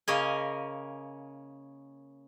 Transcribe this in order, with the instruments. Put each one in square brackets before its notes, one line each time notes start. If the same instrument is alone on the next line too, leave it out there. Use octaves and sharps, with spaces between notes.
[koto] C#3 A#3 C#4 A#4 D#5 G#5